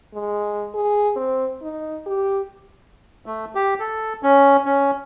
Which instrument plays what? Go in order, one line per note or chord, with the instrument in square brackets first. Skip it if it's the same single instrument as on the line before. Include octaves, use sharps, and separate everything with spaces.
[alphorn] G#3
G#4
C4
D#4
G4
[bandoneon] A3
G4
A4
C#4
C#4